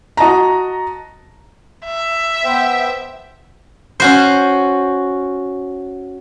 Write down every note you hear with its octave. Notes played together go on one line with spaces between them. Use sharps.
F#4 D#5 A5 A#5
E5
B3 C5 G5
C#4 F#4 C5